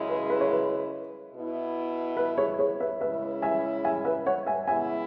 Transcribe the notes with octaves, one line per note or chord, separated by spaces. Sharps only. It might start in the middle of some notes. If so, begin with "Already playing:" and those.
Already playing: F#2 C#3 G#3 E4
B4
B4
C#5
B4
B2 B3 E4
B4
G#4 C#5
G#4 C#5
B4 E5
C#3 G#3 C#4 E4 B4 E5
E5 G#5
E5 G#5
B4 E5
C#5 F#5
E5 G#5
C#3 G#3 B3 E4 E5 G#5